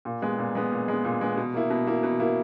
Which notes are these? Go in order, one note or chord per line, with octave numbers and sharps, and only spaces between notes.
A#2
G#3 B3
A#2
G#3 B3
A#2
G#3 B3
A#2
G#3 B3
B2
A#3 E4
B2
A#3 E4
B2
A#3 E4